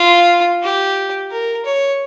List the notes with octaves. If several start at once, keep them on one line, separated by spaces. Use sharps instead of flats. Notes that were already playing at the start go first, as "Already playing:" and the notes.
Already playing: F4
G4
A#4
C#5